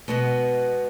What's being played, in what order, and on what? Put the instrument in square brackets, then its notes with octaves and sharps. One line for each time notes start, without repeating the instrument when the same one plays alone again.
[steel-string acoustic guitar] B2 G#3 B3